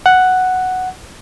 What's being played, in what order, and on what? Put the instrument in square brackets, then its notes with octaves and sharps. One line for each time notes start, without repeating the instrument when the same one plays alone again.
[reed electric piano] F#5